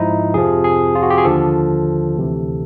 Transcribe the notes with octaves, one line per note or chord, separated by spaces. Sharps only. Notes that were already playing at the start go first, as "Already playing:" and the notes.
Already playing: G#2 F3 D#4 E4
F2 C3 F3 G#4
G#4
F4
F#4
G4
G#4
D#2 D3 F3 A4
D2 C3 E3